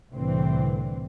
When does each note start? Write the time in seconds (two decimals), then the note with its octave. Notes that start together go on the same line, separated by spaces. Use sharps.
0.11 C2 A2 D3 E3 C4